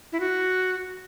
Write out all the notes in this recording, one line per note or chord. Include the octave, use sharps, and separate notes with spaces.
E4
F#4